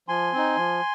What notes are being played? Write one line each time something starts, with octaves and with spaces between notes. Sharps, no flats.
F3 G#5 C6
C4 D#4
F3